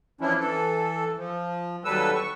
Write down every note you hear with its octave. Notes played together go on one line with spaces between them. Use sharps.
E3 F3 C#4 D4 E4
E3 A4
F3
D#2 F#3 G3 A4 B4 E6
C#6